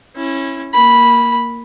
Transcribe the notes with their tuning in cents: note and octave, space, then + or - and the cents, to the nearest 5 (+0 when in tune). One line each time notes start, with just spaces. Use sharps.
C#4 -20 E4 +0
A#3 +0 B5 -10